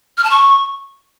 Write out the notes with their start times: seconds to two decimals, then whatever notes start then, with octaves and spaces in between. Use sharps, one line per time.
0.17 F6
0.24 A5
0.30 C#6